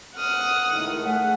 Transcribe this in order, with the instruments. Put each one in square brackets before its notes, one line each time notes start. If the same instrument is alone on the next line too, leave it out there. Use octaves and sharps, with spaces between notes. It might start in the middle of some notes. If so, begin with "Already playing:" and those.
[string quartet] F#5 D#6 F6
[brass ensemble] C#2 A2 D#3
[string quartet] A3 [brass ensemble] G#4 F#5